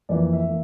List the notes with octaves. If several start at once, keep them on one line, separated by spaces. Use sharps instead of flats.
F2 E3 A#3 D5
E5
E3 A#3